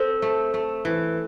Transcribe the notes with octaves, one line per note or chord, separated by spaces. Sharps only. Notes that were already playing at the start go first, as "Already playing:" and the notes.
Already playing: C4 A4
A3
A3
E3